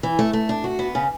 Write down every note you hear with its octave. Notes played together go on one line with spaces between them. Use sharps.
E3
A3
A3
D4
F#4
B3
C#3